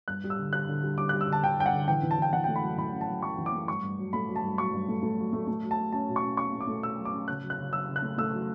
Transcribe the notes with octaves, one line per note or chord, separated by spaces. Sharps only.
G2 F#6
G3
E6
D3
G3 F#6
D3
G3
G3 D6
G3 F#6
E6
D3 A5
D3 G5
G2 G5
F#5
D3
E3 G5
E3
A5
E3 G5
E3 F#5
A3 G5
B5
F#2
E3 B5
C#4
A5
F#2
F#2 C#6
E3
D6
A3
G2 C#6
G2
F#3
A3 B5
F#3
A5
G2
F#3 C#6
G2
A3
A3
F#3
A3
A3
F#3
A5
F#3
C#4 A5
B2
C#6
C#4
C#4 C#6
A3
D6
A3
B2 E6
F#3
D6
C#4
C#3 F#6
F#3
F#6
C#3
F#3 E6
C#3
F#6
A3
A3 E6
F#3